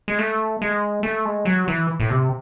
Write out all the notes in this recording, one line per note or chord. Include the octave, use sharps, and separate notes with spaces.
G#3
A3
G#3
A3
G#3
F#3
E3
A2
C3